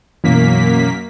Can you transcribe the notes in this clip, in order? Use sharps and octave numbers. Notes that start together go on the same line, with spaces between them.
F#2 B2 E3 A#3 B6